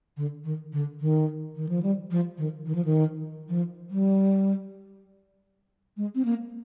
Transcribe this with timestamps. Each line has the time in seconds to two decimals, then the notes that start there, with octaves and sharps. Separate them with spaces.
0.17 D3
0.44 D#3
0.72 D3
1.00 D#3
1.56 D#3
1.69 F3
1.83 G3
2.11 F3
2.38 D#3
2.66 D#3
2.75 F3
2.85 D#3
3.49 F3
3.90 G3
5.97 G#3
6.15 C4
6.25 A#3